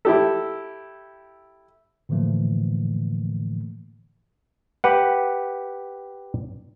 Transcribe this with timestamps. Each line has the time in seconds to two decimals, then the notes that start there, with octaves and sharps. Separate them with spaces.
0.05 E4 G4 A4
2.09 A2 D3 E3 F3 A3 A#3
4.84 G4 B4 F#5